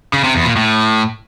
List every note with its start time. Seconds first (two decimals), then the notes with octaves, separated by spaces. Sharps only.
0.13 C#3
0.24 C3
0.35 E2
0.45 A#2
0.56 A2